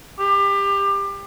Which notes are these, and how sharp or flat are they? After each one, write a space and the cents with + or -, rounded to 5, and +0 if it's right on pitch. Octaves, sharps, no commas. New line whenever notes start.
G4 +25